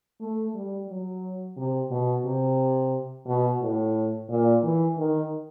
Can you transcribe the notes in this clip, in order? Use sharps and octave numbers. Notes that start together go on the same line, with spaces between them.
A3
G3
F#3
C3
B2
C3
B2
A2
A#2
E3
D#3